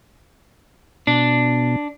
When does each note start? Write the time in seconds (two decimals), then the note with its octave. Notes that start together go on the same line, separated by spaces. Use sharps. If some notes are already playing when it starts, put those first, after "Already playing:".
1.07 B2 D4